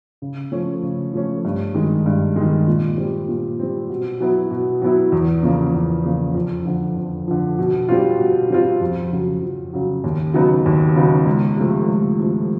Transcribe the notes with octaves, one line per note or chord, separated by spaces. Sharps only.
C#3
F3 A3 C#4
C#3
F3 A3 C#4
G2
D#3 G#3
G2
D#3 G#3
A#2
G3 C4
A#2
G3 C4
B2
F#3 B3 E4
B2
F#3 B3 E4
E2
C#3 F3 A#3
E2
C#3 F3 A#3
F2
D3 F3
F2
D3 F3
B2
G3 C4 F4
B2
G3 C4 F4
F2
C#3 F#3
F2
C#3 F#3
D#2
C#3 F#3 B3 D#4
D#2
C#3 F#3 B3 D#4
C#2
C3 F3 A3
C#2
C3 F3 A3